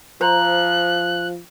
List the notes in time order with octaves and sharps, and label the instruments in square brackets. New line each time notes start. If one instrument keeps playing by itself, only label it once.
[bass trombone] F3 [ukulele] C5 A#5 [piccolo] F#6